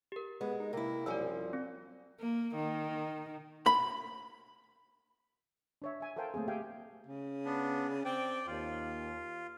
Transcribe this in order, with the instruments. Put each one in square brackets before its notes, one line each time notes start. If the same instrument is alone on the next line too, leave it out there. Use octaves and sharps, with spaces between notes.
[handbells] G4 A#4
[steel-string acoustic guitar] G#3 [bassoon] B3
[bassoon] D#4
[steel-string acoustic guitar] C3 E4 [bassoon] A#3
[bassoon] C2 [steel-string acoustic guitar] F#2 F3 G3 [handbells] D5 G#5 E6
[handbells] C4
[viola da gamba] A#3
D#3
[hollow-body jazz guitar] B5
[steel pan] D4 C#5 E5
E5 G#5
A4 A#4 C5 F5 G5 A5
A3 A#3 C4 G#4
G4 E5 F5 G5 G#5
[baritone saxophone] C#3
[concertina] B3 D4
[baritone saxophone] C4 [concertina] D5 G5
[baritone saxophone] D#2 [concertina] F4